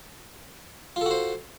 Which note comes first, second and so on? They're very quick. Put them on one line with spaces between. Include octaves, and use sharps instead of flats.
F4 A4 F#4 C5